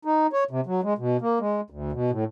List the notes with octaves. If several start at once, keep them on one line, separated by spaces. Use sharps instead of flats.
D#4
C#5
C3
F#3
G#3
B2
A#3
G#3
D2
B2
A2